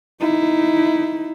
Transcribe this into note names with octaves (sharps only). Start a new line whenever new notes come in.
D#4 E4